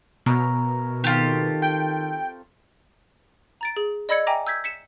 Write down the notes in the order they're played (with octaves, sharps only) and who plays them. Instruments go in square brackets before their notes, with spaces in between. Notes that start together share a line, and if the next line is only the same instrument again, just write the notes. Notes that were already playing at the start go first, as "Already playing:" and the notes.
[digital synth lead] B2 [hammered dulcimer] A#4 C#5 E5
[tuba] D#3 [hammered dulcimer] C4 A4 [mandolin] F4 G4
[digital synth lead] G5
[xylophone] A#5 A6 D7
G#4
D5 D#5 B5 E6 G#6 C#7
E5 G5 G#5 A#5 D6 A#6
E6 G6 G#6 B6
B6 C#7 E7